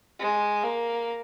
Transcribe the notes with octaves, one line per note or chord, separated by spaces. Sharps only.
G#3
A#3